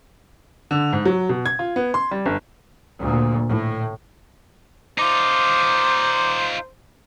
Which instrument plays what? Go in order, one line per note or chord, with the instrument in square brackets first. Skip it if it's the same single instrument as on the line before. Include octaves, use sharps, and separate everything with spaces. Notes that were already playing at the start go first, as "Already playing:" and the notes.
[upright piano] D3
G#2
F#3
B2
G#6
F4
B3
C6
G3
G1
[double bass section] D2 A#2
A2
[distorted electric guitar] D#4 F4 [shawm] C5 [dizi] D6